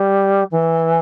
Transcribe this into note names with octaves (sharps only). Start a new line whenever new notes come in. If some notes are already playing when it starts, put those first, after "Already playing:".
Already playing: G3
E3